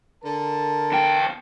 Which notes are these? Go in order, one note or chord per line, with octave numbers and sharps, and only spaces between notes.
D3 A#4 A5
E2 G5